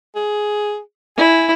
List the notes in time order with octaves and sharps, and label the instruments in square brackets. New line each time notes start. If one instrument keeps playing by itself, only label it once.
[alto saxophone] G#4
[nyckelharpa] E4 [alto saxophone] G#5